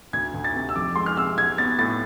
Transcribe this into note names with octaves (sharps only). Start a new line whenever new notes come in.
D2 G#6
D2
A6
C3
E6
F2 D6
G#3 C6
F6
C3 E6
B1 G#6
B3 A6
A2 A6